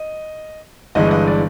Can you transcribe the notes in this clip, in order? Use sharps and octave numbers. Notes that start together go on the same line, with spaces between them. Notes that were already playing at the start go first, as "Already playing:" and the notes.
Already playing: D#5
G1 G2 E3 G#3 D#5
D#5
D5